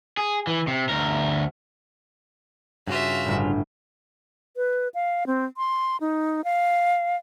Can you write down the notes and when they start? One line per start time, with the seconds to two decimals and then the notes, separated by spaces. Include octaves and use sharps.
0.17 G#4
0.47 E3
0.67 C3
0.89 D2 A#4
2.87 G2 C#3 F4 F#4 E5
3.25 G1 A2
4.56 B4
4.94 F5
5.27 C4
5.57 C6
6.01 D#4
6.44 F5